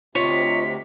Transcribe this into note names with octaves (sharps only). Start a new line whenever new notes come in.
D2 C3 F4 C#5 D#5 B6